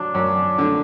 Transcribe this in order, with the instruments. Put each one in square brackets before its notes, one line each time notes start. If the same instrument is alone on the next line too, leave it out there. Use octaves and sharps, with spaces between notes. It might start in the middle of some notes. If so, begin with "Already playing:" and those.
Already playing: [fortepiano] F#3 [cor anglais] D4
[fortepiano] F#2
D3